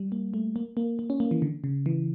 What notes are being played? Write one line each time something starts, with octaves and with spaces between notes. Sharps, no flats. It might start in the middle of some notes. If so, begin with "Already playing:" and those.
Already playing: G3
A#3
A3
A#3
A#3
A#3
C#4
A#3
E3
D3
C#3
E3